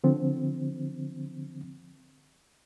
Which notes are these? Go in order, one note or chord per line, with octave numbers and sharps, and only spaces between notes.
D3 F3 C4